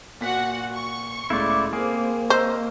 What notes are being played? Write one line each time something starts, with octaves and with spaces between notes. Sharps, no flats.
A#2 F#4 F#5 B6
C#6
C#2 A2 E4 D5
A#3 C4 G#4
C5 D#5 A#5 E6